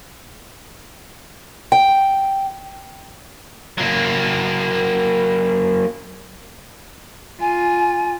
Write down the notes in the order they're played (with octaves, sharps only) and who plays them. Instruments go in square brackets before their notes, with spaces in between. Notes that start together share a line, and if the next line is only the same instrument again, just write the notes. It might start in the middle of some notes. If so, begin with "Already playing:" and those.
[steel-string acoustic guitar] G5
[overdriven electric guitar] F#3 A#3
[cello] F4 [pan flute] G#5